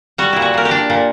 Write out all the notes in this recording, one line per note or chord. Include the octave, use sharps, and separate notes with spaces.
G3 F#4
A#2 E4
F#4
A#2 A#4
G4
D4
A#2